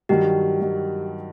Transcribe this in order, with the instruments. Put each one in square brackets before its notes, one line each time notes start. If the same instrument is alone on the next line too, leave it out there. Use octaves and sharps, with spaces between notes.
[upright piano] G2 D#3 F#3 [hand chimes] G4
[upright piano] D#3 F#3